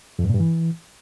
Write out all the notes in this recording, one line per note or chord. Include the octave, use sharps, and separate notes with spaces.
F2
G2
A#2
G2
E3